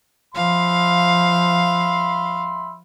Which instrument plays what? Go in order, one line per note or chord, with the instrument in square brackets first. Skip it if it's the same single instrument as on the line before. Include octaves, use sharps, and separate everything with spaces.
[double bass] F3 [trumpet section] E5 B5 C6 [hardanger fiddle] F5